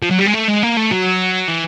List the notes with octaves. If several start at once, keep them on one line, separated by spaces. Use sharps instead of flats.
F3
F#3
G3
G#3
A3
G#3
A#3
A3
F#3
E3